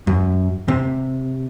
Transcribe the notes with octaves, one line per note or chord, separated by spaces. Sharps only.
F#2
C3